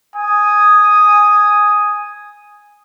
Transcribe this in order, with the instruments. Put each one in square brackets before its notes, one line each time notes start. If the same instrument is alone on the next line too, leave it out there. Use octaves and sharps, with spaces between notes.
[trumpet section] G#5 D#6